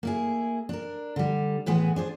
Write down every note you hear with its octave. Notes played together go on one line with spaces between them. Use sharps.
A#3 E4 G#4
D4 A#4
D3 G3
E2 A2 E3 G#3 B3
D4 G#4 C5